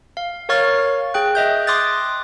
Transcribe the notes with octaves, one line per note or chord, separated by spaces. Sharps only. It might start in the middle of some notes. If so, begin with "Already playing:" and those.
F5
A#4 C#5 F5 C#6 F6 A6
G#4 G5 F#6
D#5 E5 G6
C6 D6 D#6 F#6 A6